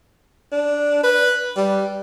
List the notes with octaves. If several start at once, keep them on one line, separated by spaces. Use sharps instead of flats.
D4
B4
G3